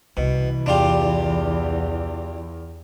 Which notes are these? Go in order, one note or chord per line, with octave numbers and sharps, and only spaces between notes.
C2 B2 E3
E2 D4 F4 G4